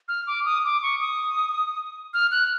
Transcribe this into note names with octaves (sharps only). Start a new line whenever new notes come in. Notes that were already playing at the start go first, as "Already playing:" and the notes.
F6
D6
D#6
D6
C#6
D#6
F6
F#6